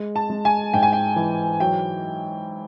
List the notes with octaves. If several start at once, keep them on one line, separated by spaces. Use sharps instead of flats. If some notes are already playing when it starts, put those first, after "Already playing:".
Already playing: G#3
A5
G#3
G#5
G#2 G5
G#5
G5
E3
F#3 G5